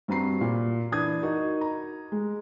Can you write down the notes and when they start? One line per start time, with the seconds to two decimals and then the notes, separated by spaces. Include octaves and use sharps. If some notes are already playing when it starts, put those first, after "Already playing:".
0.08 G2 C4 F#4 A#5 C7
0.41 A#2
0.92 E3 D4 D#6 G#6
1.22 D#4 F#4 A#4
1.61 A#5
2.12 G#3